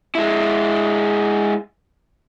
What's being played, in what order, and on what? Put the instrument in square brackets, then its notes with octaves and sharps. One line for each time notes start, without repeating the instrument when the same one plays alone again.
[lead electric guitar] G#3 E4